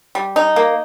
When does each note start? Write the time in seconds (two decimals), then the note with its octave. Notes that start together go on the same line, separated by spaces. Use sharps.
0.15 G3
0.36 D#4
0.56 A#3